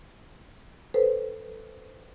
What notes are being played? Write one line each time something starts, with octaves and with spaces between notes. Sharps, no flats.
A4 B4 C5